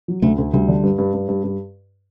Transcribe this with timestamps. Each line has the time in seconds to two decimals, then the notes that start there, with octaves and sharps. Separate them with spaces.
0.08 F#3
0.22 D2 A3
0.38 D2
0.53 D2 G3
0.68 D3
0.83 G2
0.98 G2
1.14 G2
1.29 G2
1.44 G2